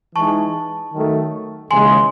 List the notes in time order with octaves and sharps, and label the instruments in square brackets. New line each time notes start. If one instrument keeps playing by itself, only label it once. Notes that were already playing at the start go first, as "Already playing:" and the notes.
[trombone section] E3 G#3 D#4 [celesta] A5 C#6
[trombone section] D#3 F#3 A3
[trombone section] D#2 C#3 E3 G#3 [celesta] G#5 C6